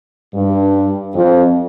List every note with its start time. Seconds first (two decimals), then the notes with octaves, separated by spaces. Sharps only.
0.34 G2
1.14 F2